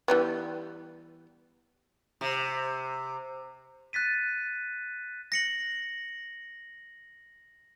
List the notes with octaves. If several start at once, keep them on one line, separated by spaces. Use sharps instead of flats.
E3 G3 B3
C3
F#6 A6 B6 D#7
A#6 C#7 F#7